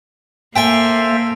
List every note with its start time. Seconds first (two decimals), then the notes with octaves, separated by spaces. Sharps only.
0.56 A#3 A4 C5 E5 G5 G#5